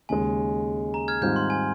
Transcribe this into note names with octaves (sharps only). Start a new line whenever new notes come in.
D#2 C#3 G#3 G#5
A#5
F6 G#6
G#2 D#3 G3 C4 F4 G6
C6
G#5